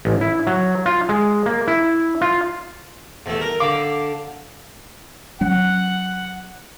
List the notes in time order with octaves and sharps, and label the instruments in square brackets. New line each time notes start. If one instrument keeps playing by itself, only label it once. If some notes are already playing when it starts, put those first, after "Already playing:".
[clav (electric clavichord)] A1
E4
F#3
F4
G#3
A#3
E4
F4
[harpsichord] E2 A3
A#4
[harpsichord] D3 [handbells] F5 [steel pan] D6
[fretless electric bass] F#3 C#4 [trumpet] F#5